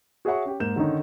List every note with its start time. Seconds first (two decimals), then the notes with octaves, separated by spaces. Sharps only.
0.25 F#4 G#4 C#5 E5 F#5 C#6
0.45 C#4 G4
0.60 G#2 A#3 G6 E7
0.76 D3 D#3 C#4 D#4